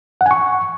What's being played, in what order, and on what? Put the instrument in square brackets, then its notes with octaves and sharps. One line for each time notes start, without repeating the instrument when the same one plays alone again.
[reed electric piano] F#5
G#5
C#6